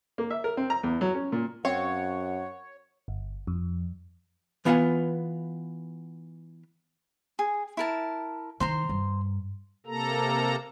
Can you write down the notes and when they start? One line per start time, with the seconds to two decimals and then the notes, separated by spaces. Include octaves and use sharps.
0.18 A#3
0.30 E5
0.44 A#4
0.57 C4
0.70 A#5
0.83 E2
1.01 F#3
1.14 C#4
1.32 A#2
1.65 F#2 C4 C#5 F5 F#5
3.08 G1
3.47 F2
4.65 E3 B3 F4 D#5 F#5 G#5
7.39 G#4
7.77 E4 A#4 A5
8.60 D#3 C5 A#5 C6
8.89 G2
9.86 C3 A#3 A4 A#5